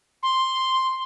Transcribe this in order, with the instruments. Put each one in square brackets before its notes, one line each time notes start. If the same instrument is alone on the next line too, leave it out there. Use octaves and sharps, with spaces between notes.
[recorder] C6